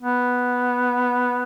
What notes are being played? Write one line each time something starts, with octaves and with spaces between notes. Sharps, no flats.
B3